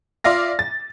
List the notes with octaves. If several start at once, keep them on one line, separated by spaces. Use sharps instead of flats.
F4 D5 E5 F5 A#6
A6